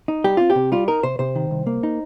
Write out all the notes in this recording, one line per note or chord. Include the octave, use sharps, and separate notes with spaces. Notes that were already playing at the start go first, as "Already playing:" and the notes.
D#4
G3 G4
C4 F4
G4
C3
G3 F4
D#4 A#4
C3 C5
C3 C5
D#3
C2
A#3
D#4